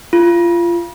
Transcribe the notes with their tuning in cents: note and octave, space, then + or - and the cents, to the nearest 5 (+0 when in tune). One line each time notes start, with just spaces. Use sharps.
F4 -25